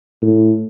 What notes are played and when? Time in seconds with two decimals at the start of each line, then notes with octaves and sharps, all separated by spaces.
0.22 A2